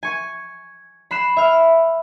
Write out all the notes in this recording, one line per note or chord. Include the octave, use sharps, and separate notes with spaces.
G#5 C#6
B5 F#6 C7 E7
E5 F6